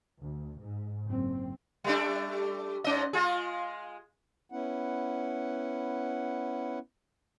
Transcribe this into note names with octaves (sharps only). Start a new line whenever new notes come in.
D2
G#2
F#1 C4
G3 A3 D4
G#2 C#4 D#5
G#3 F4 G#4
B3 C#4 E4 F#5